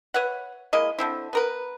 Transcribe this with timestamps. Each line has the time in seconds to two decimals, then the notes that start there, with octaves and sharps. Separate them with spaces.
0.14 B4 C#5 E5 F#5
0.73 G#3 A#3 E4 D#5
0.99 D3 C4 E4
1.33 B3 A#4 B4